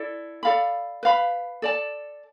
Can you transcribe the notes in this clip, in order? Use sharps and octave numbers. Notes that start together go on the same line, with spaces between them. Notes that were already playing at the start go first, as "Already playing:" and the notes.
Already playing: E4 A4 D5
A4 D5 F5 B5
B4 F5 B5
A4 D5 A5